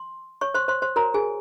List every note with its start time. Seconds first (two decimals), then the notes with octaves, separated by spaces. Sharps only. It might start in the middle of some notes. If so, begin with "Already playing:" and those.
Already playing: C6
0.41 C#5 C#6
0.54 C5 C6
0.68 C5 C6
0.82 C5 C6
0.96 F#4 A#4 C#5 A#5
1.14 G#4 G#5